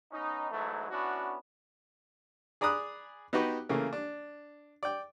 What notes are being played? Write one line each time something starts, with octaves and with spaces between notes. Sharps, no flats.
B3 C#4 D#4
G#2 E3 F#3 A3
B3 C#4 D4 E4 F#4
G#4 D5 A#5 B5 D#6 F#6
B3 D#4 F#4 G4 B4
C#3 E3 A3 A#3
D4
D5 G5